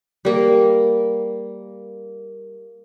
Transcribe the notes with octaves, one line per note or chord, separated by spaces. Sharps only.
G3 A#3